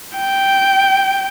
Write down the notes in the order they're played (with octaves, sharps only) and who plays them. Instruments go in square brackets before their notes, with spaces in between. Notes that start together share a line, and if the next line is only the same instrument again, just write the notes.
[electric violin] G5